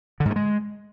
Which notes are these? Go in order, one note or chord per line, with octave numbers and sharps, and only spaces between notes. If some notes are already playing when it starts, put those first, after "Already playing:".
D3
G#2
A3
G#3